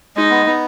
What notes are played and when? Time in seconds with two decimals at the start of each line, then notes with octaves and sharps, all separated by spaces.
0.16 G#3 D#4
0.30 B3
0.46 B3